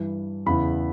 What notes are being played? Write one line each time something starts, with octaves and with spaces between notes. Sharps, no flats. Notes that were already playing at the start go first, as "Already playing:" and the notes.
Already playing: G2 E3
E2 C#3 E3 B5